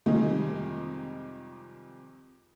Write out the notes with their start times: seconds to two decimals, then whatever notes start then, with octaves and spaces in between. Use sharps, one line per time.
0.06 F2 C3 D#3 G3 G#3 D#4